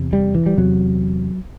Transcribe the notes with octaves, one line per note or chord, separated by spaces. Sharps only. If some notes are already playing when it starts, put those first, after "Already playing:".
Already playing: E2 C3
G3
E3
G3
E2 C3 F#3